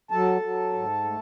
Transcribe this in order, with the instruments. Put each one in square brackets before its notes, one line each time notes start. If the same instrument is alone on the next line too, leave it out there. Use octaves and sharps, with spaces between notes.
[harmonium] F#3 A4 A5
F#3
G#2
A3